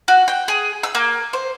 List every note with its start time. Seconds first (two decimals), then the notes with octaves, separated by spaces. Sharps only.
0.08 F#4
0.28 G5
0.48 G#4
0.83 E6
0.95 A#3
1.33 C5